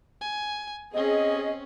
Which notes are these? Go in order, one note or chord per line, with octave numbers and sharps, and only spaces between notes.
G#5
C4 C#4 G#4 D#5